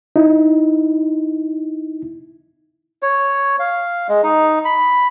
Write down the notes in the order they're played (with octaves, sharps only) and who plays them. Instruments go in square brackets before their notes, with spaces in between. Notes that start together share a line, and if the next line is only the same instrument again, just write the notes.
[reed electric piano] D#4 E4
[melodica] C#5
F5
G#3
D#4
B5